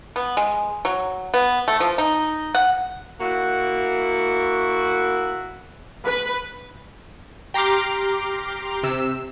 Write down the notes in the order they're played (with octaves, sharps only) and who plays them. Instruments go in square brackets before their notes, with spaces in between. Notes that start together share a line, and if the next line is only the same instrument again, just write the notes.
[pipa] B3
G#3
F#3
B3
A3
F3
D#4
F#5
[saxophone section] A#3 E4 F#4
[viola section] B4
[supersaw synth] G4 A#5 C6 D6 F6
C3 E6